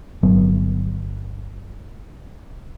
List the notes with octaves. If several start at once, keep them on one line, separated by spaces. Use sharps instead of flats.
G1 F#3 B3